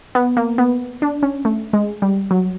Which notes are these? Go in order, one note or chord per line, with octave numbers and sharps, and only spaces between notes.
B3
A#3
B3
D4
C#4
A3
G#3
G3
F#3